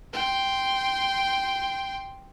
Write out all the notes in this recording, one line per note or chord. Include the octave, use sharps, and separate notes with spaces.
G5 C6